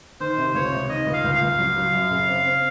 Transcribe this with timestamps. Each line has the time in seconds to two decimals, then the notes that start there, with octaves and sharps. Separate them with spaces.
0.20 D#3 C5
0.38 C3
0.54 C#2 C#5
0.72 C3
0.89 D#3 D#5
1.07 C#2
1.13 F5
1.24 C#2
1.36 F5
1.41 C#2
1.59 F#3
1.76 F#3
1.94 F#2
2.11 C#3
2.28 C4
2.46 C4